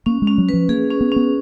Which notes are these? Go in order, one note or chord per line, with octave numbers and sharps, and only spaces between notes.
A#3 C#4
G#3
C#4
F#3
F3 B4
A#3 G#4
C#4
B3
B3 C#4